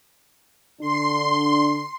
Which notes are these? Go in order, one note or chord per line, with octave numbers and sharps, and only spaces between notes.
D3 D4 C6